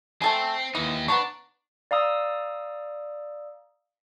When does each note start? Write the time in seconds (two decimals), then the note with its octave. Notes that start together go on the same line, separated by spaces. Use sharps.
0.22 A3 C4 A4 G#5
0.75 D#2 E3 D#4
1.08 B3 D4 A#5 C#6
1.91 D5 F5 A#5 D#6 E6